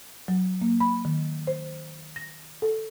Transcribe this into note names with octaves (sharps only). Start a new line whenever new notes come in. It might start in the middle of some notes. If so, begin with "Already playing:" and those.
F#3
A#3
B5
D#3
C5
A#6
A4